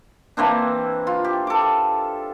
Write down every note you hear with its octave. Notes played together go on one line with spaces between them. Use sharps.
E3 A#3 C4 D4
F4
G4
A4 D6